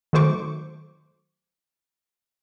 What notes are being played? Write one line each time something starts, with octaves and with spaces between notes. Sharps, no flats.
D#3 F#3 A3 C5 C#6 D6